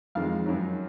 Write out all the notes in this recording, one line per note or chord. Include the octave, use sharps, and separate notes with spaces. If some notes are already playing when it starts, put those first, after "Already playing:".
F2 D#3 G#3 F5
F#2 D#3 F#3